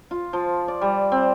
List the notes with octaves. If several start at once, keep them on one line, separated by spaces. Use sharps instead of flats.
F4
F3
D5
G3
C4